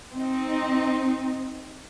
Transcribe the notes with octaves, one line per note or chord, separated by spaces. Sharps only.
C4 D#4